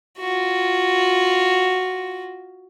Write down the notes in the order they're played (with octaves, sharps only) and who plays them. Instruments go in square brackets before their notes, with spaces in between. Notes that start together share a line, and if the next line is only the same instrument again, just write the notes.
[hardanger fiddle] F4 F#4